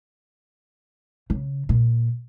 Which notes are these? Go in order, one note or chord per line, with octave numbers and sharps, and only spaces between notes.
C#3
A#2